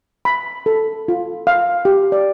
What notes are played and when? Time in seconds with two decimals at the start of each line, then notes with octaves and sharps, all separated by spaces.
0.25 B5
0.66 A4
1.08 F4
1.47 F5
1.85 G4
2.12 D5